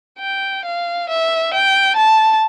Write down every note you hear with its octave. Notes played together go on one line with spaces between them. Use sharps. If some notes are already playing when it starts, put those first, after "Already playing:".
G5
F5
E5
G5
A5